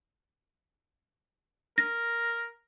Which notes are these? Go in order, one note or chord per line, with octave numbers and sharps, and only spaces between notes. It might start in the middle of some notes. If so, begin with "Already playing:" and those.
A#4 A#6